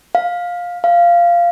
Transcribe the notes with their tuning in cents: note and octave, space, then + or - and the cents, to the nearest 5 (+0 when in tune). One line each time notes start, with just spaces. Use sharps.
F5 +15
F5 -10